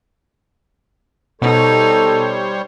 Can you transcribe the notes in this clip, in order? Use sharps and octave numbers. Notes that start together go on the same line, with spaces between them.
B2 G3 D#4 A4 C5 C#5